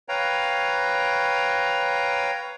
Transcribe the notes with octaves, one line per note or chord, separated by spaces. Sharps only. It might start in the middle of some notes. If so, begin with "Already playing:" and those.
B4 C#5 F5 G5 A#5